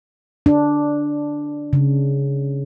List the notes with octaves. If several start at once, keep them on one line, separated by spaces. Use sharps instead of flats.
D4
C#3